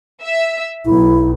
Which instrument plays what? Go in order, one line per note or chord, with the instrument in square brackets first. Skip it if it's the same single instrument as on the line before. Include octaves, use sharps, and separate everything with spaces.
[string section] E5
[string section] B1 [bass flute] E4